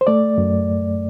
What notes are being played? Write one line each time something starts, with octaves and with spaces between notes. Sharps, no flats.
C5
A3 D5
F#2